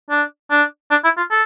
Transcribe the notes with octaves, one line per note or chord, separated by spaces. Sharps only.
D4
D4
D4
E4
F4
A4